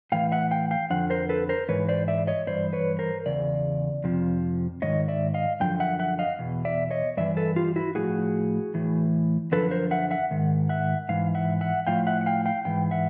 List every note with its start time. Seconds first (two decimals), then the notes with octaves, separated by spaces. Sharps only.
0.12 A2 E3 F5 G5
0.32 E5 F#5
0.51 F5 G5
0.71 F5 G5
0.90 F2 D3 F3 F#5
1.10 A#4 C5
1.29 A4 B4
1.49 A#4 C5
1.68 G#2 E3 B4 C#5
1.89 C5 D5
2.08 D5 E5
2.27 C#5 D#5
2.47 G2 E3 C5 D5
2.73 B4 C#5
2.99 A#4 C5
3.26 E2 C#3 D5
4.04 F2 C3 F3
4.82 G#2 D#3 C#5 D#5
5.08 D5 E5
5.34 D#5 F5
5.60 F#2 D3 F3 G5
5.80 E5 F#5
5.99 E5 F#5
6.19 D#5 F5
6.39 E2 B2
6.65 D5 E5
6.91 C#5 D#5
7.17 G2 E3 D5 E5
7.37 A4 B4
7.56 F4 G4
7.76 E4 F#4
7.95 A2 F3 F#4 G#4
8.74 A2 E3
9.52 F#2 D3 F3 A4 B4
9.71 A#4 C5
9.91 E5 F#5
10.11 E5 F#5
10.31 G#2 D#3
10.69 E5 F#5
11.09 G#2 E3 F5
11.35 E5 F#5
11.61 E5 F#5
11.87 A2 F3 F5 G5
12.07 E5 F#5
12.21 F#5
12.26 F5 G5
12.46 F5 G5
12.65 G#2 E3 G5
12.91 E5 F#5